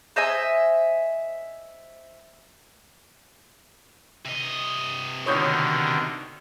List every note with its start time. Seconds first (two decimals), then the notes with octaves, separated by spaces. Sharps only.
0.16 C5 D#5 E5 G#5
4.25 C3 D#5
5.26 B2 D3 D#3 C#5 D#6 G6